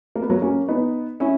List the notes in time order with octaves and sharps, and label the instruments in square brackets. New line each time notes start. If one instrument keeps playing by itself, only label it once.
[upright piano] A#3
B3
F#3 A#3
A#3 C#4
B3 D#4
C#4 E4